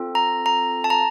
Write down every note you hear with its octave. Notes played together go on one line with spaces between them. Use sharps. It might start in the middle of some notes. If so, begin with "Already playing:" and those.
Already playing: C4 F4 A4
A#5
A#5
A5
A#5